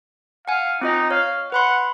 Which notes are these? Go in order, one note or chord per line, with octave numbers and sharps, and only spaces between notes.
F5 F#5 G#5
C4 D#4 F4 D#5
C#5 F5
B4 F#5 B5 C6